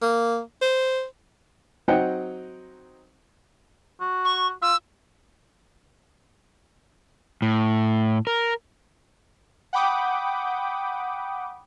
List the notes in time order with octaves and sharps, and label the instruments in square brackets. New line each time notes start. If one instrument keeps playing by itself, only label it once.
[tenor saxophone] A#3
C5
[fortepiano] F#3 C4 D#4 D#5 F#5 G5
[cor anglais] F#4
[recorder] C#6
[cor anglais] F4 [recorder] E6
[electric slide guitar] A2
A#4
[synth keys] F#5 G5 B5 D6 D#6 G6